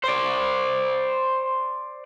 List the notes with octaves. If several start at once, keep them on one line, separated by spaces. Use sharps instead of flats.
C5 D5